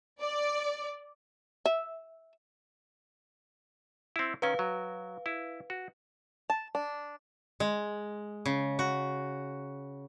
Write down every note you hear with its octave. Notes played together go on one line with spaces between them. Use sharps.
D5
E5
C4 E4
D#3 C#4 B4 F5
F#3
E4
F#4
A5
D4
G#3
C#3
F#4